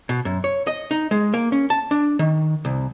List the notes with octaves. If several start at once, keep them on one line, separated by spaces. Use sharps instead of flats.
B2
F#2
C#5
D#5
D#4
G#3
A#3
C#4
A5
D4
D#3
C2